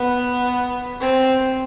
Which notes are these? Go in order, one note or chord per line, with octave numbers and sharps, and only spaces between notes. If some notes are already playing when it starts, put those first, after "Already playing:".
Already playing: B3
C4